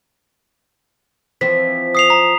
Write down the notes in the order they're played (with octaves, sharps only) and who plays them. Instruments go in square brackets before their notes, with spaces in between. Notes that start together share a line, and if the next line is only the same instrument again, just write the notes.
[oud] E3 F3 C4 [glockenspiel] B6
[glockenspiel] D#6 C7 F7
A#5